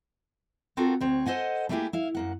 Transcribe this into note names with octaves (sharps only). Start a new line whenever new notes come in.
C4 F4 F#4 A4 A#4 F#5
D2 C4 C#5
A4 C5 D#5 F#5 G#5
G3 A3 A#3 E4 G4 G#4
E4 F5
F#2 A#3 F#5